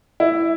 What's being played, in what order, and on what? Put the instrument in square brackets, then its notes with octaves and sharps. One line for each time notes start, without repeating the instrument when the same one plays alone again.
[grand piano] E4